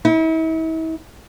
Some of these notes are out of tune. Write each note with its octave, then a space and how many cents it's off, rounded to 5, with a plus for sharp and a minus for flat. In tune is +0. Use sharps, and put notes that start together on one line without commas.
E4 -40